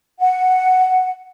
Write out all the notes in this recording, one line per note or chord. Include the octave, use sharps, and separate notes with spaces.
F#5